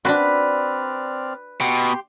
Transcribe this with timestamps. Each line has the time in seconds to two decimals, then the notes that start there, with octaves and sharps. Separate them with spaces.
0.05 C4 D4 F#4 B4 D5 B5 F6
1.60 B2 G4 G5 C6